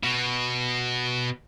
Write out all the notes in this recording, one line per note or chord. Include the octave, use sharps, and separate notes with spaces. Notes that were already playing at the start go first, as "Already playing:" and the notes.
B2